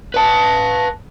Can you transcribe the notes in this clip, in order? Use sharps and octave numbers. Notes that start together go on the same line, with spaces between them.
B4 A5